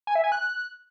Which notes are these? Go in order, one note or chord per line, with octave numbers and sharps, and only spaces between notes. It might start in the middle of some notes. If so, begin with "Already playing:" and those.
G#5
E5
G#5
F#6